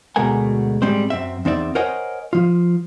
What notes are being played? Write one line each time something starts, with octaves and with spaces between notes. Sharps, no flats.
D2 B2 G#3 A3 A#4 G#5
A2 G3 G#3 C4 C5
F#2 C4 E5
E2 C4 D#4 D5 E5
A#4 C5 C#5 D#5 F#5 G#5
F3 F4